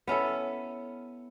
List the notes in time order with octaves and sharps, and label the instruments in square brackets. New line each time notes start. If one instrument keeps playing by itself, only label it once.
[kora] B3 C#4 E4 A4